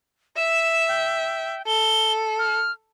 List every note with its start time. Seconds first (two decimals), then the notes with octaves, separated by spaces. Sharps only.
0.37 E5 E7
0.89 G5
1.67 A4 G7
2.39 F6